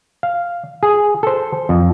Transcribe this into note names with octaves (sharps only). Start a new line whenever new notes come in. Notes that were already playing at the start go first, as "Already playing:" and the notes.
F5
G#4
A4 C5
F2